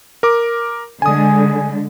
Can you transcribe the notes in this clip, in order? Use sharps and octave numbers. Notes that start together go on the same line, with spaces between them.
A#4 D6
D3 G#3 G#5 D#6